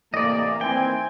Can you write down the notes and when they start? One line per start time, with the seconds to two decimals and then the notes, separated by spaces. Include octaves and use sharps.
0.14 A2 C3 E3 A#3 D5 D#5
0.61 D#3 E3 C4 G5 G#5